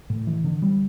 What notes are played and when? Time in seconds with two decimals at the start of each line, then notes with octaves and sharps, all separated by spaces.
0.10 A2
0.27 E3
0.44 D3
0.62 G3